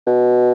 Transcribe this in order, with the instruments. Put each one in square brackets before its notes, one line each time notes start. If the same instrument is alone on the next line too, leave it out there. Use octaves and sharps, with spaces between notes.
[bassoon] B2